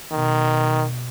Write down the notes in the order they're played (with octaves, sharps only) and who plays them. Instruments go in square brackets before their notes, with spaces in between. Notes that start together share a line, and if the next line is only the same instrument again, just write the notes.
[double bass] B2 [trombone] D#3